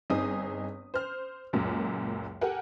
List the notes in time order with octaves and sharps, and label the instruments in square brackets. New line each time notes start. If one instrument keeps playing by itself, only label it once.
[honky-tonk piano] G1 C4 D#4 G#4 D#6
C5 F6
C#2 F#2 A#2
G4 A4 A#4 F#5 G#5